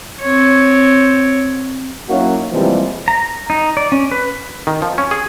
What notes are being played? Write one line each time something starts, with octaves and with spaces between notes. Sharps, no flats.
C4 C#5
F#3 A#3 C#4 D#4 E4 F#4
C3 E3 F3 G3 G#3 A#3
A#5
D#4
D5
C#4
B4
D#3
F3
C#4
G#4